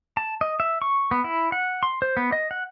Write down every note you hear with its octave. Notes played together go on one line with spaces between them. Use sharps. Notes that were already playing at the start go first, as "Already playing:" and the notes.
A5
D#5
E5
C#6
B3
E4
F#5
C6
C5
B3
D#5
F#5